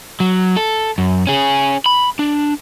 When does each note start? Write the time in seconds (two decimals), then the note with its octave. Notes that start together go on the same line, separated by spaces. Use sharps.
0.20 F#3
0.56 A4
0.98 F#2
1.27 C#4 G#4
1.86 B5
2.19 D4